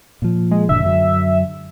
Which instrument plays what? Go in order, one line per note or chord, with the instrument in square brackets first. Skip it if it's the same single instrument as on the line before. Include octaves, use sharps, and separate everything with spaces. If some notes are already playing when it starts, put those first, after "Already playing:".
[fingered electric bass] A#2 F3
[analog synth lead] G#3
[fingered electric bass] F#1 A#2 D3 [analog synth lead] E5
[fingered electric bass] F#2 D3 F#3